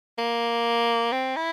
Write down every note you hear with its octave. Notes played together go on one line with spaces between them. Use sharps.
A#3
C4
E4